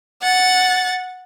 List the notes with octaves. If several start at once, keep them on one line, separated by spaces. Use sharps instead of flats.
F#5 A6